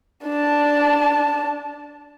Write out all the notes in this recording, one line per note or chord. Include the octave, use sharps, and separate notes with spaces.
D4 A5